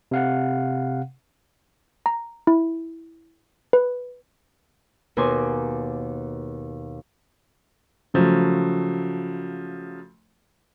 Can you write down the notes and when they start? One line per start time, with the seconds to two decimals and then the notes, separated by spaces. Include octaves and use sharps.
0.11 C3 F5 F#5
2.06 A#5
2.47 E4
3.73 B4
5.17 D#2 B2 A#4 G#5 C6 D6
8.14 C#3 F3 F#3 A3